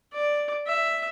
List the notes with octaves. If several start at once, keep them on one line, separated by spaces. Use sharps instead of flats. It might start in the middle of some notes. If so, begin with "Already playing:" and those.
D5
E5